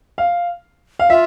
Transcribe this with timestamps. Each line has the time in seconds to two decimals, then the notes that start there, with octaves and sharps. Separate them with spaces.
0.18 F5
0.99 F5
1.09 F4 E5